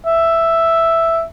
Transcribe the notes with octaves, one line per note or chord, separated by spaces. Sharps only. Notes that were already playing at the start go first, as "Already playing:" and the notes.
E5